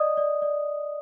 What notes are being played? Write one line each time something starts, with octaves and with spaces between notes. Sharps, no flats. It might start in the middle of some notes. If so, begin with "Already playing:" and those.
Already playing: D5 D#5 D#6
D5
D5